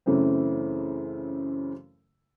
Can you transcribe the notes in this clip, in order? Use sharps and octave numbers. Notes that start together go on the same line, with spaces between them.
F#2 C#3 E3 A3 C4